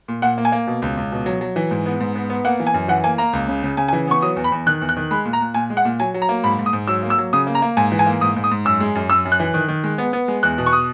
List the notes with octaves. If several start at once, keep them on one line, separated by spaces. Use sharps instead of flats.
A#2
A#2 F#5
A#3
G#5
A#3
B2
C#2
C#2
B2
F#3
F#3
E3
G#2
B3
G#2
B3
B3
A#3 F#5
E3
G#5
F#2
E3 F#5
A#3 G#5
A#3 A#5
C#2
C#3
C#3
C#3 G#5
G#5
E3
B3 C#6
F#3 D#6
E2
B5
E2
D#3 F#6
E2
F#6
D#3
G#3 B5
A#2
A#5
A#2
A#2 G#5
G#3
F#5
A#2
F#3 G#5
F#3
A#5
A#3
G#2 B5
G#2
D#6
G#2
F#3 E6
A#3
E6
F#3
C#3 D#6
A#3
A#5
A#3
G#2 G#5
E3
G#5
A#3
G#2 D#6
G#2
D#6
G#2
F#2 E6
G#3
F#2
F#2 E6
F#2
F#6
E3
D#3
D#3
G#3
B3
B3
G#3
E2 F#6
B2
C#6
D#6